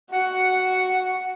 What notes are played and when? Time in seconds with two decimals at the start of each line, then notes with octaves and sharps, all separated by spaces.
0.12 F#4 F#5